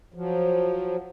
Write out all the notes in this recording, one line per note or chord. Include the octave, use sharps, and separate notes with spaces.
F3 F#3